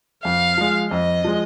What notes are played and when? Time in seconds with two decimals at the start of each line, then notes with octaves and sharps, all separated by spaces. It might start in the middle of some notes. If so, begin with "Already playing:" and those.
0.24 F2 F5
0.57 F3 G#3
0.91 F2 D#5
1.24 F3 G#3